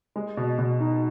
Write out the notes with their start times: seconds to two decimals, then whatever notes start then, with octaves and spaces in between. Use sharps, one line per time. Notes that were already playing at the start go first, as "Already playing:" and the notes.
0.16 G#3
0.37 B2
0.58 B2
0.80 D#4